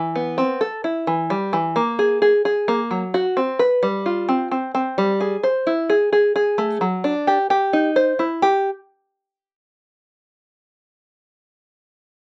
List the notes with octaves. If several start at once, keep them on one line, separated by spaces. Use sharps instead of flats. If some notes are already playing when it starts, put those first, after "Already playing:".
Already playing: E3
B3
C4
A4
E4
E3
G3
E3
A#3
G#4
G#4
G#4
A#3
F#3
F#4
C4
B4
G3
F4
C4
C4
C4
G3
G#4
C5
E4
G#4
G#4
G#4
A3
F#3
D4
G4
G4
D#4
C5
E4
G4